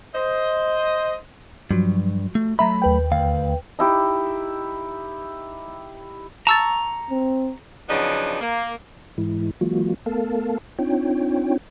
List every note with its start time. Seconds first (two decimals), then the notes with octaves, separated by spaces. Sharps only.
0.14 C5 D#5
1.71 G2 F3 F#3
2.35 A3
2.59 F#3 A3 E5 A#5 B5
2.82 D#2 B4 G5
3.12 D2 F5
3.79 D#4 E4 G4
6.47 A5 A#5 C#6 E6 A6
7.10 C4
7.89 C#3 F3 F#3 B3 D4 D#4
8.40 A#3
9.18 G#2 E3 G#3 E4
9.61 E3 F#3 G#3 A#3 F4 F#4
10.06 A3 B3 A4 A#4 F5 A5
10.79 C4 D4 D#4 F4 C#5 G5